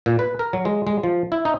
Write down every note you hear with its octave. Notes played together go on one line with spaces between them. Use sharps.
A#2
B4
A#4
F#3
G#3
G#3
F3
E4
D#4